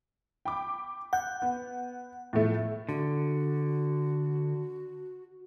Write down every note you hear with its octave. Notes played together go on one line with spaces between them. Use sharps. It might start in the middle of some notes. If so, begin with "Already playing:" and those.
G5 B5 D6
F#5 G6
B3
A2 F3 A3
D3 F#4